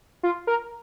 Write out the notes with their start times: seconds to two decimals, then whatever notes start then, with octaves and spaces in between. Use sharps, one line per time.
0.23 F4
0.47 A#4